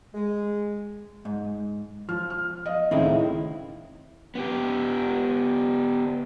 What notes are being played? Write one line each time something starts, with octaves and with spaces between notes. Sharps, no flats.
G#3
G#2
F3 F6
F6
D#5 F5
C#2 A2 D#3 C4 D#4 E4
B3 G4